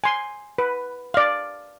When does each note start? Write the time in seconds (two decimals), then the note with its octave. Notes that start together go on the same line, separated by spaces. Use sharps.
0.04 G#5 C6
0.58 B4
1.14 D5 F5